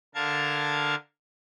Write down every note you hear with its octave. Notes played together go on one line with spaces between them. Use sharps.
D3 A#4 F5 A5 G#6